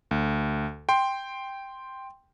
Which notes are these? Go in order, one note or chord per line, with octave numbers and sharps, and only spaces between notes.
D2
G5 C6